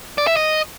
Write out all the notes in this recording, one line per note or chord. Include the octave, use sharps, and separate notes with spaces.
D5
E5
D#5